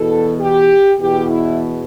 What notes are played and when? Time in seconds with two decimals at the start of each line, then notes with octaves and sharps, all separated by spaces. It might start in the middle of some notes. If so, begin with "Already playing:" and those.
Already playing: E2 B2 A4
0.38 G4
0.99 E2 B2 G4
1.30 E4